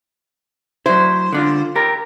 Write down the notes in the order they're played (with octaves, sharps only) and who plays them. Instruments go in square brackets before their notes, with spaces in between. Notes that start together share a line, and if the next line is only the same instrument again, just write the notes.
[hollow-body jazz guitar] F#3 E4 [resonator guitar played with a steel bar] C5
[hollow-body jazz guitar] D3 D4 F4
G4 A#4